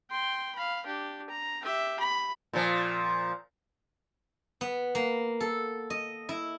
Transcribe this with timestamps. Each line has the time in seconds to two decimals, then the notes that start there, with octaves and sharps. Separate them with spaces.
0.10 G5 C6
0.55 F5 B5
0.86 D4 G4
1.30 A#5
1.62 G4 E5
2.00 B5
2.53 A#2 F3
4.61 B3
4.95 A#3
5.40 A4
5.90 D#5
6.29 E4